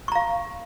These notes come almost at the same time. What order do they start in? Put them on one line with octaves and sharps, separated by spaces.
C#6 A#5 F5